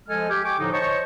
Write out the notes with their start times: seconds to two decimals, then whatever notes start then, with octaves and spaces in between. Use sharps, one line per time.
0.09 F3 G#3 A4 D#5 G#5 F6
0.30 G4
0.44 G5 G#5 C#6 D6
0.59 A2 D3 F3 D#4
0.72 C5 C#5 D#5 A5 C#6